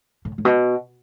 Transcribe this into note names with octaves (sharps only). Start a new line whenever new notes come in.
A2
A2
B2